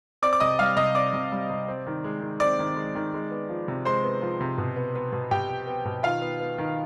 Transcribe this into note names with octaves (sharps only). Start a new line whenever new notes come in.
C4 D5 D6
D6
C3 D#5 D#6
G3 F5 F6
C3 D#5 D#6
C4 D5 D6
C3
G3
C3
C4
D#3
G#3
D#3
C4 D5 D6
D#3
G#3
D#3
G#3
B3
F3
C3
G#3 C5 C6
B3
F3
C3
B2
B3
B3
B2
B2 G4 G5
B3
B3
B2
D#3 F4 F5
B3
B3
D#3